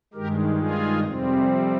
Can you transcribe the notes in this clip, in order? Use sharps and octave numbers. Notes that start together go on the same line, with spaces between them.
G2 D#3 G#3 G4 A#4
F4 G#4
F2 C3 G3 C4